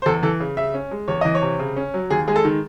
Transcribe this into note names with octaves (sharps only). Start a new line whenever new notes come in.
C5
E2 A4
E3 A4
C#3
C#3 E5
C#4
G#3
E2 C#5
E3 D#5
C#5
C3
C#3
C#4
F#3
D#2 G#4
G#3 G#4
A4
D#3